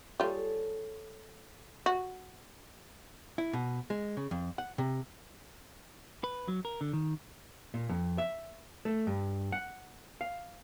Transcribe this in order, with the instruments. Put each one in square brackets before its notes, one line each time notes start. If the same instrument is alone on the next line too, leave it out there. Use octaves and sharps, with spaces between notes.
[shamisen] G3 F4 [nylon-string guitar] G#4 A4 C#5
[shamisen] F#4
[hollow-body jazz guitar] E4
B2
G#3
C#3
F2
F#5
C3
[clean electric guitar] B4
F#3
A#4
D3
D#3
[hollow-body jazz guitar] A#2
F2
E5
A3
G2
F#5
F5